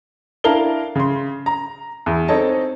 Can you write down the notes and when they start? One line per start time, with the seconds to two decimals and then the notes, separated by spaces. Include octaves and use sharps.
0.44 D4 E4 A#4 F5 A5 G7
0.96 C#3 C6
1.46 A#5
2.06 E2
2.28 C4 D#4 A4 C#5 D#5 A5